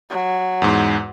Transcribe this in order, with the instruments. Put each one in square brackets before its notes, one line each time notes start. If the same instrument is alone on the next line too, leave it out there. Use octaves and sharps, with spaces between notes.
[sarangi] F#3
[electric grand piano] E2 G#2